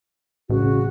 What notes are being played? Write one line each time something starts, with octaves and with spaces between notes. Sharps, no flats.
A1 C#3 F#4